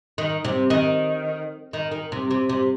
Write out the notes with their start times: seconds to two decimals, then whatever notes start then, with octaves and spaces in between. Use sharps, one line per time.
0.18 D#3
0.45 C3
0.70 D#3
1.73 D#3
1.92 D#3
2.12 C3
2.31 C3
2.49 C3